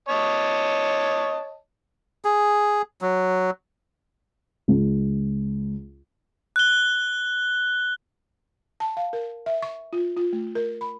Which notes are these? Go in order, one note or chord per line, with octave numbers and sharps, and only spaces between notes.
C#5 D#5 A5
G#4
F#3
C#2
F#6 G7
A5
F5
A#4
E5
C#6
F4
F4
A3
A#4
B5